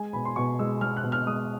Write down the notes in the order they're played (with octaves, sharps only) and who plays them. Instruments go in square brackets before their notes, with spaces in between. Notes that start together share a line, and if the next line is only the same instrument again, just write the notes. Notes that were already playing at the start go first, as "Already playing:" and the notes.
Already playing: [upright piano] G#3 G#5
B2 B5
C6
B2 C#6
G#3 E6
G#3 F6
F#6
B2
F6
G#3 D#6